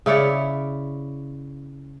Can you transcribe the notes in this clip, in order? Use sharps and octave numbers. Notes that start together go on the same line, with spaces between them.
C#3 E4 C#5 D5